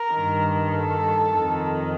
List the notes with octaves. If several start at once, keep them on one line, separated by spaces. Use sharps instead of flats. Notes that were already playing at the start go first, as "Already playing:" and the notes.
Already playing: A#4
G2 D#3
A4
F2 D#3